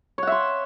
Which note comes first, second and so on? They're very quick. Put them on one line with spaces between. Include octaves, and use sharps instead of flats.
C#5 F#5 E5 C6